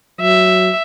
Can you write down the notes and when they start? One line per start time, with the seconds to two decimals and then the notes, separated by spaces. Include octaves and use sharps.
0.21 F#3 E5